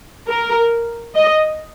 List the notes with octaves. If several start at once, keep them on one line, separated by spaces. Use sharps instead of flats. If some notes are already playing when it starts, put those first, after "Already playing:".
A#4
D#5